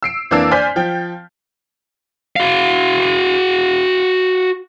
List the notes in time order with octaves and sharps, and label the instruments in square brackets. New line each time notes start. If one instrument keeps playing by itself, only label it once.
[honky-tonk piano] E6 C7 D7
F2 E3 A#3 D4 E6 C7
C5 D5 G#5 F6 G6 B6
F3 G5
[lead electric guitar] F#4 F5